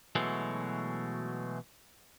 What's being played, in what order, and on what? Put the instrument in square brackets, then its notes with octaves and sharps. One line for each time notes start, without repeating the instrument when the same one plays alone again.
[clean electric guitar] B2 E3 F#3 G#3 A3